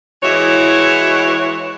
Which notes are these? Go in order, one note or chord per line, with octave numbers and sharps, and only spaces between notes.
E3 G#3 E4 F#4 C#5